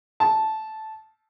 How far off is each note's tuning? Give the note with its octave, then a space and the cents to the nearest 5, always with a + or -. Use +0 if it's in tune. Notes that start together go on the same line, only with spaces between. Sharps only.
A5 -10